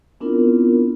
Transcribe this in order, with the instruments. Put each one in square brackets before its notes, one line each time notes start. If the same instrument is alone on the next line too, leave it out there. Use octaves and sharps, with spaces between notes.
[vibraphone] B3 C4 D4 E4 F4 A#4